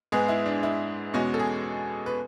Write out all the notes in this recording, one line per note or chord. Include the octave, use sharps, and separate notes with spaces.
G#2 G#3 B3 G#4
E4
D4
E4
E2 B2 G#3 C#4 F#4
A4
G#4
B4